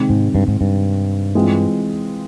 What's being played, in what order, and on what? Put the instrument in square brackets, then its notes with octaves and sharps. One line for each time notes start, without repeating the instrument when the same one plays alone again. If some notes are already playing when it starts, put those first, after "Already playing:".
Already playing: [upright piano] C3 D#3 G#3 C4
[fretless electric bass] G#2
G2
G#2
G2
[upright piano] E3 G#3 C4 F4